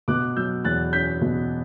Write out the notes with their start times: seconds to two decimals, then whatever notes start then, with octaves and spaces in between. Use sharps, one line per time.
0.08 B2 D6 F#6
0.37 F#3 E6 G6
0.64 E2 F#6 A6
0.93 C#4 G6 B6
1.21 B2